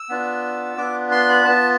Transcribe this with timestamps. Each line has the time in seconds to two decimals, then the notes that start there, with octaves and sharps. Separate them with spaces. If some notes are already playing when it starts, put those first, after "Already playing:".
Already playing: E6
0.09 B3 D4 F4
0.77 B3 D4 F4 D6
1.11 C6
1.29 B5
1.45 B3 F4 A5